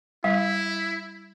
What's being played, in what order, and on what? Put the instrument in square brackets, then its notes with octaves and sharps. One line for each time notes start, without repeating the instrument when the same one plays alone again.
[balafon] G3 [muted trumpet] E4 [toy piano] F5